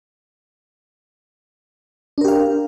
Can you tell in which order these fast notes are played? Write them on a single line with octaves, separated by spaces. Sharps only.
D4 A#4 G4 F5